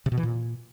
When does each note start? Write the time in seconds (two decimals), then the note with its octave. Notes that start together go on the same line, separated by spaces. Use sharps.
0.06 C3
0.12 B2
0.17 E3
0.23 A#2